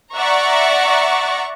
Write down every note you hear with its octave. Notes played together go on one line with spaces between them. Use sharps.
D5 E5 F#5 A#5 C#6